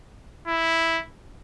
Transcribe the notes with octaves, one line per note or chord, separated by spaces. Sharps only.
E4